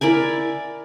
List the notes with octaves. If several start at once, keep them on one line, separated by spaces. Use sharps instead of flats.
E4 A#4 D5 G#5